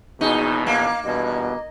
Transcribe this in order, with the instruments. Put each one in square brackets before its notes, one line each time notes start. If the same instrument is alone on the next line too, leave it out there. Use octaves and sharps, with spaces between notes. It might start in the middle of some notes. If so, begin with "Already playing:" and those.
[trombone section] A#1 E2 B2 [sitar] D#4 [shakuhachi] G#4
[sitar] A#3 [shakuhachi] F5
[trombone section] E2 G2 B2 [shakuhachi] D#5